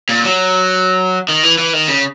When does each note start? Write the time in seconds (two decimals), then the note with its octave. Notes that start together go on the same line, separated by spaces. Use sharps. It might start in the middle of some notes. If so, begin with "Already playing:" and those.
0.09 A#2
0.24 F#3
1.29 D#3
1.43 E3
1.58 E3
1.73 D#3
1.88 C#3